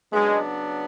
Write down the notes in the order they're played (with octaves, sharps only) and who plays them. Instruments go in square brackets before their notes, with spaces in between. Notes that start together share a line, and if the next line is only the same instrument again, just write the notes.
[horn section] C#3 F#3 B3 D4 [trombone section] G#3